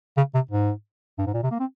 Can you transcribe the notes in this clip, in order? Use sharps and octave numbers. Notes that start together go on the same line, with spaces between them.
C#3
C3
G#2
G2
G#2
A#2
C3
A#3
C4